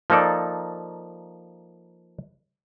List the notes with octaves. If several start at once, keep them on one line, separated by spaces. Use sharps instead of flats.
F3 A#3 D#4 A4 D5